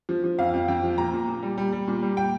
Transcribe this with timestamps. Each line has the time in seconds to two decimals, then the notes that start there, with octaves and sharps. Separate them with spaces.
0.09 F3
0.24 F3
0.38 F2 F5
0.54 F2
0.68 F2 G5
0.83 F3
0.98 A#2 A#5
1.13 A#2
1.28 A#2
1.43 G3
1.58 G3
1.72 G3
1.88 A#2
2.03 G3
2.17 G5